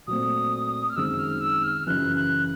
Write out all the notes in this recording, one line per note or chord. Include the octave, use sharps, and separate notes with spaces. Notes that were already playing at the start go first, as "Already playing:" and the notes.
A#2 F#3 A3 C4 D#6
F6
F#2 D#3 G#3 C4 E6
F6
E6
F6
F#2 C#3 E3 F#6
F#6